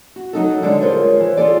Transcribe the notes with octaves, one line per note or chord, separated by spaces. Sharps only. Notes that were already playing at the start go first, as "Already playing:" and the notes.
F#4
F#3 D#4 A4
D3 G3 G#3 D5
F4 G#4 A#4 C5 C#5
E3
F4 G#4 A4 D5